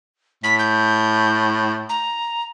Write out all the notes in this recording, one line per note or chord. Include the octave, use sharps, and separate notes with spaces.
A2 B6
G6
A#5